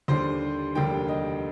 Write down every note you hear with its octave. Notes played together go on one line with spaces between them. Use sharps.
D#2 D3 G3 C5
F1 D#2 D3 G3 A#3 G5
D#5